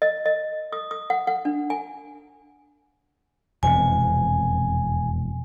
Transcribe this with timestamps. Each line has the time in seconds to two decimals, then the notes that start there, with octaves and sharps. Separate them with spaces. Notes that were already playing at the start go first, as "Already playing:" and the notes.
0.02 D#5
0.26 D#5
0.72 D#6
0.91 D#6
1.10 F#5
1.27 F#5
1.45 D4
1.70 G#5
3.63 E1 F2 C3 G#5